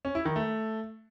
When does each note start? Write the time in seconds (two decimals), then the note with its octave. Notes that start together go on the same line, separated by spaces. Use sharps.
0.05 C#4
0.15 E4
0.25 D#3
0.36 A3